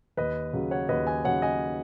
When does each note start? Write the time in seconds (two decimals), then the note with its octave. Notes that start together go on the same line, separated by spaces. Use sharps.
0.17 D#2 B4 D#5
0.53 C#3 F#3
0.71 C#5 F#5
0.89 D#2 B4 D#5
1.07 D#5 G#5
1.25 C#3 F#3 C#5 F#5
1.42 D#5 G#5